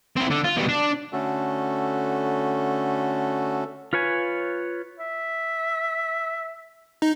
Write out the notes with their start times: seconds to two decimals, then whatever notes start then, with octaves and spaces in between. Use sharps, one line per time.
0.16 C4 E4
0.30 D3
0.44 F4
0.57 B2 G3
0.68 D4
1.13 D3 A3 C#4 F#4 A4
3.93 F4 B4 C#5 G#5
5.00 E5
7.02 D#4